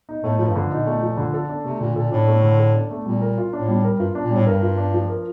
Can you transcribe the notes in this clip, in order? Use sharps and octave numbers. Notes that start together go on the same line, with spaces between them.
D#4
A2 A3
A2 F3
G2
D3
A#2 D#4
A3
F3
D3
A4
D4
C3 A3
A#2 D3
A#2 A4
A2 D4
A3
D3
A4
D4
A3
A#2 G3
A#4
F4
A2 D4
G3
A#4
G2 F4
D4
A#2
A2 G3
G2 A#4
F4
D4
F3
A#4